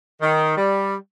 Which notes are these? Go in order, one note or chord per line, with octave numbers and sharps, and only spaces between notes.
D#3
G3